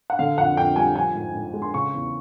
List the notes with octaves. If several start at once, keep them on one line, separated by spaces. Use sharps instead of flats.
F#5
D3 F5
F2 F#5
F2 G5
G3 G#5
F3 G#5
G#2
G#2
G#3
C6
C#3 C#6
E2